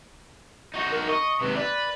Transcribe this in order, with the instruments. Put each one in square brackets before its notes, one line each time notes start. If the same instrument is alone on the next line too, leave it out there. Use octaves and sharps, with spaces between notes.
[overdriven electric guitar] D#4 F#4
[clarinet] A#4
[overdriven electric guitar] D#5 [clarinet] C#6
[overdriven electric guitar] D#2 C3 [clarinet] B4
[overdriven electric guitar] B4 [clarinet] D5